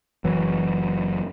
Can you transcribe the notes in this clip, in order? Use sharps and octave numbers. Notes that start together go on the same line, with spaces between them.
F#1 E3 F#3